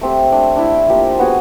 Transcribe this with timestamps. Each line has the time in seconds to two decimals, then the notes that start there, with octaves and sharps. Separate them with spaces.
0.01 A3 C4 G4
0.31 A3 D4 G5
0.57 D4 E4 E5 G5
0.88 F3 A#3 G4
1.19 B3 F#4 G#4 D#6